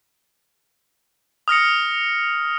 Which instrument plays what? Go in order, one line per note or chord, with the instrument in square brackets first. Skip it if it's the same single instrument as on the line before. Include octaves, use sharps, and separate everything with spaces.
[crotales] D#6 F6 A#6 C#7